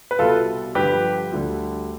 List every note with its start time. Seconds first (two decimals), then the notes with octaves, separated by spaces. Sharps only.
0.11 B4
0.19 C2 B2 G3 F4 A4
0.75 G2 D3 F3 G4 B4
1.32 D2 D3 G3